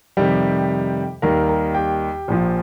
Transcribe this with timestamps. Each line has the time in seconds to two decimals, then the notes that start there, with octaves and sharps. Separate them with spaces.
0.17 F2 C3 D#3 G3 G4 G5
1.22 D#2 D#3 G3 A#4 A#5
1.49 A#4 A#5
1.75 G4 G5
2.28 A#1 A#2 F3